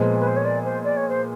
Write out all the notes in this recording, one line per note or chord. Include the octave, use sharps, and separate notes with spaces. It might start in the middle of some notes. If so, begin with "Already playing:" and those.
Already playing: A#2 F3 G#3 B3
B4
C5
C#5
D5
C5
D5
C#5
C5